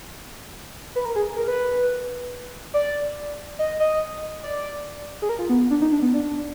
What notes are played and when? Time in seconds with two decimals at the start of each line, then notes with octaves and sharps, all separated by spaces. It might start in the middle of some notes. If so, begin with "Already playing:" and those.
0.96 B4
1.05 A#4
1.16 G#4
1.37 A#4
1.48 B4
2.74 D5
3.59 D#5
3.80 D#5
4.43 D5
5.22 G#4
5.29 A#4
5.39 F4
5.50 B3
5.71 D4
5.82 D#4
5.92 D4
6.02 B3
6.14 D4